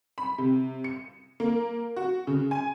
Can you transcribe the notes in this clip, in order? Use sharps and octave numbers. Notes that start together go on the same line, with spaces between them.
B5
C3
C#7
A#3
F#4
C#3
G#5